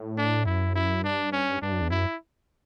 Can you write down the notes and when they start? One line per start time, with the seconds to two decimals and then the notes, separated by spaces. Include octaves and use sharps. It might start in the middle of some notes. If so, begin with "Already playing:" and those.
Already playing: A2
0.18 D4
0.46 F#2 E4
0.75 E4
1.04 G2 D4
1.33 C#4
1.62 G2 D4
1.72 F#2
1.81 E2
1.90 F#2 E4